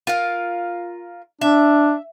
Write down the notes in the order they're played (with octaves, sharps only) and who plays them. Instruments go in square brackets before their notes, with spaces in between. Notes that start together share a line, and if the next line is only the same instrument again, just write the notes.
[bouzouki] F4 A#4 F5
[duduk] D4 [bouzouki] E5